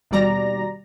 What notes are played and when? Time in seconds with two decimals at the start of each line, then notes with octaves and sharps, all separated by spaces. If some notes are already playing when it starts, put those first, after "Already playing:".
0.11 D#2 B2 G3 D5 A#5 A#6